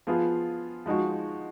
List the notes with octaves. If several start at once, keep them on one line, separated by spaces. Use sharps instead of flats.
F3 B3 F4 G#4
F3 G#3 D#4 F#4